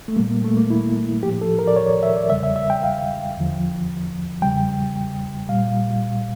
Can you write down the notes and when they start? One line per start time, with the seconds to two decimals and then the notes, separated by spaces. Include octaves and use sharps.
0.08 A3
0.16 A#2 G3 A#3
0.31 A#3
0.44 A3
0.57 A#3
0.70 E4
1.23 A2 F3 G4
1.41 A4
1.59 A#4
1.67 D5
1.76 C#5
2.03 E5
2.17 D5
2.29 E2 C#3 G3 E5
2.43 E5
2.56 E5
2.70 G5
2.83 F5
3.37 E2 D3 F3
4.42 E2 C#3 G3 G5
5.49 A#2 G3 F5